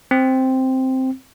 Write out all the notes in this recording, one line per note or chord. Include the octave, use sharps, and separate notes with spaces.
C4